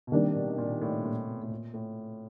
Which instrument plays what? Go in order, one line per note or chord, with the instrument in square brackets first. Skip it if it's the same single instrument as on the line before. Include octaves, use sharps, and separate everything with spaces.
[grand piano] B2
[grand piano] C3 [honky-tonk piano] D#3 G3 A#3 D4 G4
[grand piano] B2
A#2
A2
A#2
B2
A2
A#2
A2